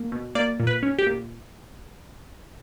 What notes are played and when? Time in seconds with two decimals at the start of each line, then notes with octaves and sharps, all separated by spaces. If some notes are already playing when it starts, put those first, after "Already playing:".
Already playing: A#3
0.12 B2
0.35 A#3 D5
0.60 A#2
0.67 B4
0.83 C#4
0.99 G4
1.07 A#2